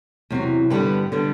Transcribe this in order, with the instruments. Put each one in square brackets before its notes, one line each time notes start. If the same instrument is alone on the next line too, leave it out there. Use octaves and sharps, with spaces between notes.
[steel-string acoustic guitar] E2 C3 F#3
G2 D3 G3 B3 G4 B4
D3 G3 B3